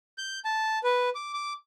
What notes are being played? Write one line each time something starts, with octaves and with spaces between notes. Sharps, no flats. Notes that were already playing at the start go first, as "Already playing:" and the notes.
G6
A5
B4
D6
D6